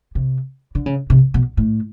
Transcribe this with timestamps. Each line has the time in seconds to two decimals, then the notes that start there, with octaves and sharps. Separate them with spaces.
0.15 C3
0.75 D3
0.86 C#3
1.10 C3
1.34 B2
1.57 A2